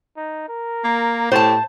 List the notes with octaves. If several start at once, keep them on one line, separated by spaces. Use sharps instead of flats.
D#4
A#4
A#3
A2 G4 C5 A5